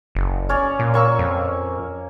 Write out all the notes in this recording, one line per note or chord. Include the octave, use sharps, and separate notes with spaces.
F#1
C#4 C#5 D5
A#2
A#3 C#6 E6
F2